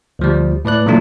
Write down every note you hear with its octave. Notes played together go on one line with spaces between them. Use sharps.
D2 F3 G3
A2 B4 D5 F#6
A#2 D#3 E3 F#3 A3 D4